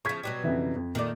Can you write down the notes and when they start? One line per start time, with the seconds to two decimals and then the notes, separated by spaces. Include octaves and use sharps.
0.05 C#3 F3 C#6 G#6 B6
0.23 B2 F#3 G3
0.44 F2 C#3 E3
0.76 F2
0.95 A#2 D#3 A3 D5